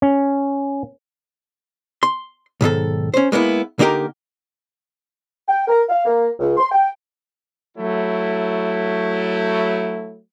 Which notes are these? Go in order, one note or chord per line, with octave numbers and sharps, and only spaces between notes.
C#4
C6
B1 G#2 D#3 A4
C#4 C5
G#3 A#3 B3 E4
D3 A#3 D#4 G4 A#4
G5
A#4
F5
A#3
C#2
C6
G5
F#3 A3 E4